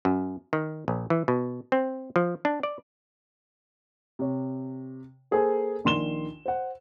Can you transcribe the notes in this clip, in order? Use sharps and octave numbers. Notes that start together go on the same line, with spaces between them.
F#2
D#3
A#1
E3
B2
C4
F3
D4
D5
C3 C#5
A#3 G#4 A4 C5 G#5
A#1 D#3 C6 E7 G7
C5 F#5